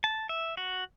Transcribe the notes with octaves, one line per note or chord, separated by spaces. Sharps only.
A5
E5
F#4